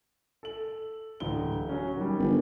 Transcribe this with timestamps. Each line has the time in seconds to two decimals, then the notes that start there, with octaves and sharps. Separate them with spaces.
0.43 A4 F#7
1.20 D1 E3 G7
1.69 F#3 C#4
1.97 D#3 G3
2.19 G1